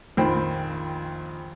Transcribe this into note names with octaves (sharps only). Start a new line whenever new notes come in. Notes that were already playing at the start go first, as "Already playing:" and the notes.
A#1 F2 D#3 C5 G5 B5